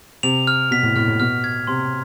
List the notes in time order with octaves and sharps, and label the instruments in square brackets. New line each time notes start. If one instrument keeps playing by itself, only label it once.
[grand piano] C3 [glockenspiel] F7
[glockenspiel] F6
[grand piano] B2 [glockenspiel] B6
[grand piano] A2
[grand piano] A2 [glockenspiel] F6
[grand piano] A2
[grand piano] B2 [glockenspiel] F6
[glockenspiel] G#6
[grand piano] C3 [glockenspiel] C6